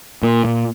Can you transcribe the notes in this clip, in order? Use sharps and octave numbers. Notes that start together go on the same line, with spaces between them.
A#2
A#2